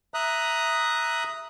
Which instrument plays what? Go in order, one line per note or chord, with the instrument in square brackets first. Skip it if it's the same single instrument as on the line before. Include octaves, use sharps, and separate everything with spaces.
[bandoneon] E5 A#5 D#6 F#6